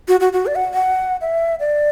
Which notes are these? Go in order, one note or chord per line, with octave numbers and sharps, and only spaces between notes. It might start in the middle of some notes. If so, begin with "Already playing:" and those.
F#4
F#4
F#4
D5
F#5
F#5
E5
D5